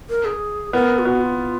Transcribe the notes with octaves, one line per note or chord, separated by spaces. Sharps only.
A#4
G#4
B3 A#4
F4
B3 F#4
F4